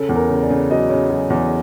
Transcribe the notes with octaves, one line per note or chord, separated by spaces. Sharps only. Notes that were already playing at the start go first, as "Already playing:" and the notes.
Already playing: C#3 A4
E2
A#4
C#3
D5
C#3
F#3 D#5
C#3
F#3
E2